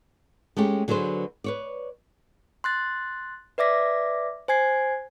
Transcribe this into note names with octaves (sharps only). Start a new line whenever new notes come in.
G#3 A3 C#4 G4
D3 F#3 G#4 B4 C5
B4 C#5 D5
C6 F#6 A6
B4 D5 E5 D6 A#6 B6
C5 G#5 G#6 C7